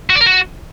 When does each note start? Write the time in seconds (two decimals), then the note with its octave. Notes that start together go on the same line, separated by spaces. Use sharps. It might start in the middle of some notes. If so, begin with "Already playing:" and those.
0.10 F#4
0.15 D5
0.21 A#4
0.26 F#4